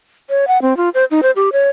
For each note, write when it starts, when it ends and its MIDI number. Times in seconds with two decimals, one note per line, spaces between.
0.30 0.48 73
0.48 0.61 78
0.62 0.76 60
0.77 0.89 65
0.94 1.05 72
1.11 1.21 63
1.23 1.31 72
1.36 1.49 67
1.53 1.69 73